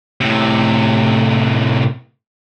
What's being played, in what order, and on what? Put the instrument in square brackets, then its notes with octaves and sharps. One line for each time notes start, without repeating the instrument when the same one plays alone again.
[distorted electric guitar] A2 C3